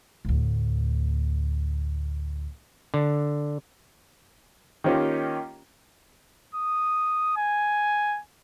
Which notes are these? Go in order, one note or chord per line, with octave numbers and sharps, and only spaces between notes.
D2 A2
D3
D#3 A#3 C#4 F4 G4
D#6
G#5